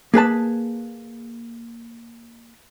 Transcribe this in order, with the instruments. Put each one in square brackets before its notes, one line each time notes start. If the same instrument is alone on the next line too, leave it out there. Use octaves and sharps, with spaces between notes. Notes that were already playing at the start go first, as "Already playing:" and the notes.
[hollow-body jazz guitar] A#3 G#4 B4 A5